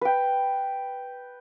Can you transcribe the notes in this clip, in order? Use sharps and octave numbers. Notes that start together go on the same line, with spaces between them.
B4 G5